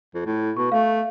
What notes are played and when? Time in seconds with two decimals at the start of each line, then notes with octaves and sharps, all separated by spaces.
0.14 F2
0.26 A2
0.57 B2 C#6
0.72 A3 F5